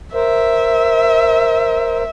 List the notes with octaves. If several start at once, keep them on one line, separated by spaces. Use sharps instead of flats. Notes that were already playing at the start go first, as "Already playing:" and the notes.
A#4 C5 E5